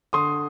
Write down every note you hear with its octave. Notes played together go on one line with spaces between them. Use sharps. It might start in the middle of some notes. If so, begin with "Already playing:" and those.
D3 C6 D#6